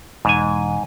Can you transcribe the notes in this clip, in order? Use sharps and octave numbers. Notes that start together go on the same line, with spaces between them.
E1 G#2 G#5